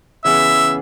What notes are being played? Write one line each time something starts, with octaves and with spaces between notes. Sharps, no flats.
C#3 E3 B3 G#4 E5